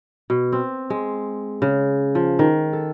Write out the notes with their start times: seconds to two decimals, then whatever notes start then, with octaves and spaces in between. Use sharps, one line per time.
0.30 B2
0.52 C4
0.90 G#3
1.62 C#3
2.15 F3
2.39 D#3
2.73 A4